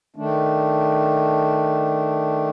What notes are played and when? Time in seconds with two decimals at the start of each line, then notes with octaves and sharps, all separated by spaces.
0.16 D#3 A3 D4